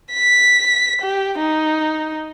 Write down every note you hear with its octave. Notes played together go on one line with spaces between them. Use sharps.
B6
G4
D#4